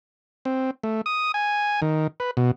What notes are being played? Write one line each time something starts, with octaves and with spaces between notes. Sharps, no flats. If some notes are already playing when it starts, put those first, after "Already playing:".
C4
A3
D#6
G#5
D#3
B4
B2